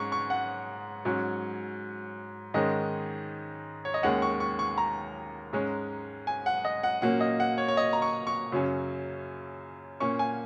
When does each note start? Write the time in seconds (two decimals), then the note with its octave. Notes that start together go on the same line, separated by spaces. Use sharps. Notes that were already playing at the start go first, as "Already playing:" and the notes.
Already playing: G#2 G#3 C#4 C#6
0.12 C#6
0.30 F#5
1.05 G#2 F#3 C#4
2.54 G#2 D#3 G#3 C#4 D#5
3.85 C#5
3.94 D#5
4.03 D#2 D#3 G#3 C#4 F#5
4.22 C#6
4.40 C#6
4.59 C#6
4.78 A#5
5.53 G#2 G#3 C#4
6.27 G#5
6.46 F#5
6.65 D#5
6.83 F#5
7.02 A#2 F#3 A#3 C#4 F#5
7.20 D#5
7.40 F#5
7.58 C#5
7.68 C#5
7.77 D#5
7.93 A#5
8.02 C#6
8.27 C#6
8.52 F#2 C#3 F#3 C#4
10.00 A#2 A#3 C#4 C#6
10.19 G#5